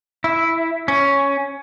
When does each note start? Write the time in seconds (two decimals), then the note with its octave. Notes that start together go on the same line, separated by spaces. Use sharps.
0.24 E4
0.88 C#4